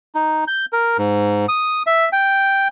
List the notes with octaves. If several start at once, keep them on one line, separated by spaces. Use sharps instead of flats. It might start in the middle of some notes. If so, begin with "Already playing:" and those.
D#4
G6
A#4
G#2
D#6
E5
G5